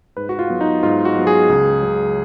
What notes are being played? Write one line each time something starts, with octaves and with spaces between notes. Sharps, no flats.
G#2 B4
F#4
F4
F#3 B3
D#4
G#2 F4
F#4
F#3 B3
G#4
C#2
C#3 F#3